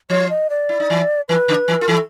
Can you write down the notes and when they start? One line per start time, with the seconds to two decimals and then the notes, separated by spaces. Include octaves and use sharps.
0.10 F3 F4 C#5
0.30 D#5
0.50 D5
0.69 E4
0.80 D#4
0.90 E3 E4
1.29 E3 E4 B4
1.48 D3 D4
1.68 E3 E4
1.81 F4 A#4
1.88 E3 E4 A4